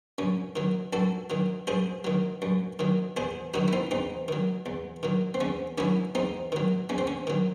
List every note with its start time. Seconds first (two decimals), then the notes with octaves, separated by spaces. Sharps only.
0.18 F#2 C#4
0.56 D#3 F#3
0.93 F#2 F#4 A4
1.30 D#3 F#3
1.67 F#2 G#4 C5
2.04 D#3 F#3
2.42 F#2
2.79 D#3 F#3
3.17 E2 G#4 C5
3.54 D#3 F#3 D#4 F#4
3.68 E4
3.73 C4 D#4
3.91 E2 C4 D#4
4.28 D#3 F#3
4.66 E2
5.03 D#3 F#3
5.34 C4
5.41 E2 C#4
5.78 D#3 F#3 C#4 E4
6.15 E2 C4 D#4
6.52 D#3 F#3
6.89 E2 C#4
6.98 C4
7.07 C#4
7.27 D#3 F#3